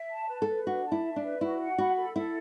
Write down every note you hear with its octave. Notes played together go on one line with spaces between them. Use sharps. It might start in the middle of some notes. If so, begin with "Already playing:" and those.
Already playing: E5
A5
B4
A4
B4
D4 F#4
A5
E4
E5
D4
B4
E4 F#4
F#5
F#4 B5
A4
E4 A4